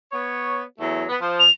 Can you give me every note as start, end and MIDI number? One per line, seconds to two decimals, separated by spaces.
0.12 0.61 59
0.12 0.61 73
0.80 1.04 40
0.80 1.04 54
0.80 1.04 57
1.09 1.17 59
1.21 1.44 53
1.40 1.51 101